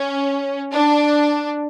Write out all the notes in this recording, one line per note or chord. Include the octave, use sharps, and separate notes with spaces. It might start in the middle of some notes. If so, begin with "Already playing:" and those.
Already playing: C#4
D4